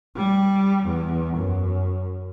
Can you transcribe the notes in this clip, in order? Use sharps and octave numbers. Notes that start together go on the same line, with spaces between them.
G3
E2
F#2